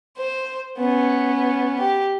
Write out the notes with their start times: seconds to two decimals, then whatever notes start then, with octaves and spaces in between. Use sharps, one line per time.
0.17 C5
0.78 B3 C#4
1.79 G4